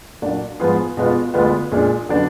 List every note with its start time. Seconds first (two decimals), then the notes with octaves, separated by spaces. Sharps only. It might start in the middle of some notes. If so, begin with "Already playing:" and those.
0.22 A#2 F#3 A#3 D4 F#4
0.60 G#2 F3 B3 F4 G#4
0.97 B2 G#3 B3 F4
1.34 D2 D3 G#3 B3 F4
1.72 A#2 G#3 D4 F4 G#4
2.09 D3 F#3 B3 D4